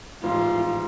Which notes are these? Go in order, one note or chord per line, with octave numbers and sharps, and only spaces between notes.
A1 G#2 F3 F4